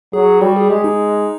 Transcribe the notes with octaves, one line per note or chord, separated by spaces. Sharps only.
F#3 G#4
G3 F#4
G#4
G#3 G4
D#4